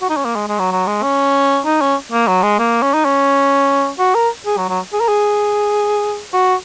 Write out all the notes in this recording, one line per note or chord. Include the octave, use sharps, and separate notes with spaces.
F#4
D#4
C#4
A#3
G#3
G#3
F#3
F#3
G#3
C#4
D#4
C#4
A#3
F#3
G#3
A#3
C#4
D#4
C#4
F#4
A#4
G#4
F#3
F#3
G#4
A#4
G#4
F#4